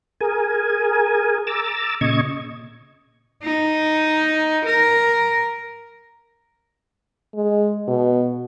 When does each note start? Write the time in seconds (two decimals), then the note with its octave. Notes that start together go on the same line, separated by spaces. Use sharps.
0.21 G#4 A#4 G#5
1.47 A#5 D6 E6 A6
2.01 A#2 C#3 D#5 C#6 G#6
3.44 D#4
4.66 A#4
7.35 G#3
7.88 B2